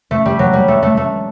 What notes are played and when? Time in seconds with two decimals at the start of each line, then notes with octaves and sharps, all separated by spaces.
0.11 A3
0.25 G3
0.39 F#3
0.53 G3
0.68 A3
0.83 A3
0.97 A3